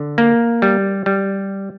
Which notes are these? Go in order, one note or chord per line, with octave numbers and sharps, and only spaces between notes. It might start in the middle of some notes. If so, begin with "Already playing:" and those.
Already playing: D3
A#3
G3
G3